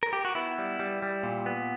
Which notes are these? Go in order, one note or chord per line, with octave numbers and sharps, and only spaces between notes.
A#4
G4
F#4
B3 E4
G3
G3
G3
A#2
B3